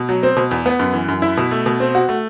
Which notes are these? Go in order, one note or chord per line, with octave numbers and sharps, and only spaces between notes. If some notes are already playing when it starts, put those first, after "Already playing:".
Already playing: B2
F#3
C4
B2
E2
B3
F#2
E3
F#2
E4
B2
A3
B2
C4
F#4
A3